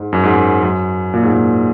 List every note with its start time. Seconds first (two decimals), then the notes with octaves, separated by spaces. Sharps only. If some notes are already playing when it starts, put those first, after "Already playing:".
Already playing: G#2
0.13 F#2
0.23 G#2
0.33 F#2
0.63 F#2
1.14 A#2
1.23 G#2
1.32 A#2